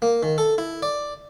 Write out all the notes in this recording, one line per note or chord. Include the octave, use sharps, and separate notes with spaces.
A#3
D#3
A4
E4
D5